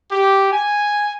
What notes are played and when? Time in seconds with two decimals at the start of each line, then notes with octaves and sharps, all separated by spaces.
0.11 G4
0.52 G#5